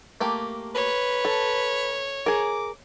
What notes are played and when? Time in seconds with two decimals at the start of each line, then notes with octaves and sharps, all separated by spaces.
0.20 A3 A#3 G4
0.75 B4 C#5
1.25 A4
2.26 G#4 A#4 D6